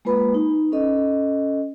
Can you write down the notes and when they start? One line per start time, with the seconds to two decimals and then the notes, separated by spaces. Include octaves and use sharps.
0.05 G#3 A#3 F4 B4 B5
0.34 D#4
0.72 C#4 A4 D#5